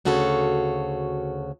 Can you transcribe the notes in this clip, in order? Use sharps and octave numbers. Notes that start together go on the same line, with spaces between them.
D2 C#3 F#4 A4 C#5